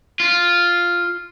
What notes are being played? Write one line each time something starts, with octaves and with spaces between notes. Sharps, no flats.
F4